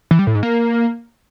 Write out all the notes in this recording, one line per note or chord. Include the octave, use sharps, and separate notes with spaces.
E3
G3
A2
G#2
A#3